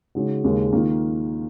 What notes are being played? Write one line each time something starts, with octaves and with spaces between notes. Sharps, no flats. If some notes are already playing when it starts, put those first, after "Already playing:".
C#3 G#3 D#4 F#4
D#2 C#3 G#3
D#3 A#3 F4